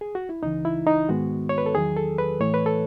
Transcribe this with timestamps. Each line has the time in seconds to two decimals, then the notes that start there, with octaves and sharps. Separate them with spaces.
0.01 G#4
0.15 F#4
0.29 E4
0.43 C#2 C#3 E3 D#4
0.65 E4
0.87 D#4
1.09 G#2 D#3 G#3 B3 F#4
1.49 C#5
1.58 B4
1.66 A4
1.75 E2 D#3 F#3 G#4
1.97 A4
2.18 B4
2.40 A2 E3 A3 C#5
2.54 B4
2.66 A4